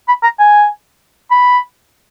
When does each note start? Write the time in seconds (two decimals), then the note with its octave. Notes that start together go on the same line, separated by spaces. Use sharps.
0.08 B5
0.23 A#5
0.39 G#5
1.31 B5